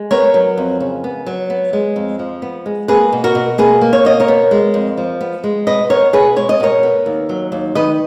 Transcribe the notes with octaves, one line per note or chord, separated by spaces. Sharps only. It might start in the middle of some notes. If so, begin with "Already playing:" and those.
Already playing: G#3
B3 A#4 C#5
F#3
F2
C#3
B3
F#3
B3
G#3
F2
F3
B3
G#3
A#3 G#4 B4
B2
F#4 A#4
B2
A#3 G#4 B4
A#3
C#5
B2 D#5
A#4 C#5
B3
G#3
F2
F3
B3
G#3
B2 B4 D#5
B3 A#4 C#5
B2 G#4 B4
G#3 C#5
D#5
B2 A#4 C#5
B3
D#2
F#3
D#2
D#3 B4 D#5